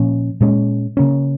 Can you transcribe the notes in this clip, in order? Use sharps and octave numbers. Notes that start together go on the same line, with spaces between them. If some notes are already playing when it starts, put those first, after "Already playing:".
Already playing: A#2 F3 A#3 C#4
A#2 G#3 C#4
C#3 A#3 C#4